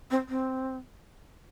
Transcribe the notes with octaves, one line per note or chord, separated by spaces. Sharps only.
C4
C4